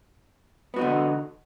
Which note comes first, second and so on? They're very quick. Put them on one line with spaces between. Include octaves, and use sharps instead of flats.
B3 F#4 D#4 D3